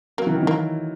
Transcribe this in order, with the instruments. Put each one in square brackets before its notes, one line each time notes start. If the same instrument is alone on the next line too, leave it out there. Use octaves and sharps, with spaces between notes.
[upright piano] F#3 [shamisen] A#3
[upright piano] E3
D#3
[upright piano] E3 [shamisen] A#3